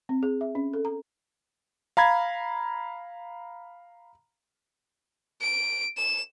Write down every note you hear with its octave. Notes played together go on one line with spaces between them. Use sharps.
C4
G#4
E5
C#4
A4
A#5
F5 A#5 B5 G#6
D7
E7